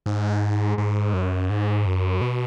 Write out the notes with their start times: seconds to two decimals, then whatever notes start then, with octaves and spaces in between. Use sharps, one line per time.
0.06 G#2
0.78 G#2
1.14 F#2
1.50 G#2
1.86 F#2
2.21 B2